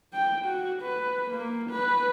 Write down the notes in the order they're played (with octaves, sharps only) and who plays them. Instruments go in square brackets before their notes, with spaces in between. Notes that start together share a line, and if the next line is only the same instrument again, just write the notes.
[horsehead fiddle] G5
F#4
B4
A#3
B4